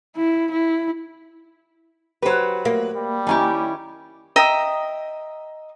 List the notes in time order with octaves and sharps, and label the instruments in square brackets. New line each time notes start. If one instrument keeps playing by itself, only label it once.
[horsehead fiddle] E4
E4
[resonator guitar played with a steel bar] F#3 B4 [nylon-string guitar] G4 C5
[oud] A#3
[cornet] G3
[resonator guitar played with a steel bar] D#3 C#4 G4 [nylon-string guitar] E4 G#5
[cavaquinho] D#5 E5 G5 A#5